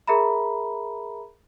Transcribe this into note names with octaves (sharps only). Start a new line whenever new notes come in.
G#4 A#4 E5 A#5 B5